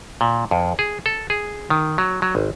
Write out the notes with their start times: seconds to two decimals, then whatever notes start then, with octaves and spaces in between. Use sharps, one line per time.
0.21 A#2
0.51 F2
0.79 G#4
1.06 A4
1.30 G#4
1.70 D#3
1.98 F#3
2.22 F#3
2.35 G#1